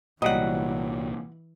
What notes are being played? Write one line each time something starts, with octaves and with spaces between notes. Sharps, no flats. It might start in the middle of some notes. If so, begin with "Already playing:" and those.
C2 A#2 E3 F#3 G3 E4 D#5 F#5